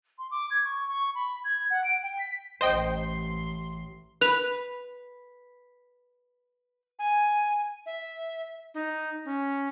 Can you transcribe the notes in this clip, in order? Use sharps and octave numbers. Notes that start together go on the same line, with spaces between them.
C6
D6
G#6
C#6
C#6
B5
G#6
F#5
D7
G5
B6
A1 C5 D#5 G5 C6
B4 F#6 F7
G#5
E5
D#4
C#4